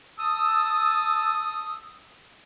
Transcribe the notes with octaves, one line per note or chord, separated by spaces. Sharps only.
A5 D#6 E6